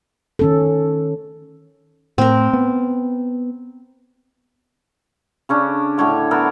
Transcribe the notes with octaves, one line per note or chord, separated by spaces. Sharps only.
D#3 C#4 A4
A2 C4 A#4
B3
C#3 C#4 D4
A2 D3 C#5 G5
B3 A4 A#4